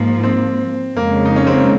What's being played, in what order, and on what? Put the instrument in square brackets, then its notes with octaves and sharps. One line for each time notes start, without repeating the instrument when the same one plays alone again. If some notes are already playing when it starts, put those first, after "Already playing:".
Already playing: [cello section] G#2 F3 A#3 [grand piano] D#4
[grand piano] C4
[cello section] F2 C#3 G#3 [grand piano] A#3
[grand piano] D#4
C#4
C4
A#3